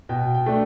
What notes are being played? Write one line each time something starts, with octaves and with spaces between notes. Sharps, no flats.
B2 G5
G5
A3 D4